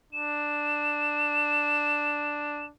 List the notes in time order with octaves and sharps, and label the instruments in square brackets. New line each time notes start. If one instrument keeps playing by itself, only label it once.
[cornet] D4 [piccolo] E7